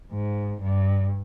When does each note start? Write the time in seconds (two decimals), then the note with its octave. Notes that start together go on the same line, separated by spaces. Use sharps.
0.12 G#2
0.62 G2